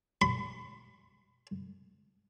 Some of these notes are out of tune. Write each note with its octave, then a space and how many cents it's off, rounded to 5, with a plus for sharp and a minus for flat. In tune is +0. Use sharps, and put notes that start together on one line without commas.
B5 +35